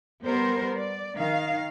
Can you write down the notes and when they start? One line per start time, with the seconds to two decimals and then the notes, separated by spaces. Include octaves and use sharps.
0.23 G3 B3 A#4 C5
0.75 D5
1.17 D#3 F5